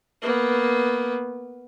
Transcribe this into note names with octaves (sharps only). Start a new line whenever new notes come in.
A#3 B3